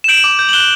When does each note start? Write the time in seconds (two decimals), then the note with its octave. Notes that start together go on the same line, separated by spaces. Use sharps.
0.04 E7
0.08 G6 D7 F#7
0.24 D6
0.39 G6
0.49 F#7
0.53 F#6 E7 G7